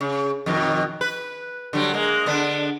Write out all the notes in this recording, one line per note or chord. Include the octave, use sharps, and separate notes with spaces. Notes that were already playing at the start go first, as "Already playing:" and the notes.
C#3
F2 B2 D#3
B4
D3 F#3 G3
G#3 A#3
D3 B3 D4